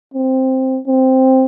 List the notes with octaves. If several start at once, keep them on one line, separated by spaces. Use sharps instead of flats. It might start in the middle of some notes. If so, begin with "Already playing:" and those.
C4
C4